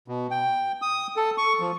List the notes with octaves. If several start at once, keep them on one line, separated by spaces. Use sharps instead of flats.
B2
G5
D#6
A4
C#6
F3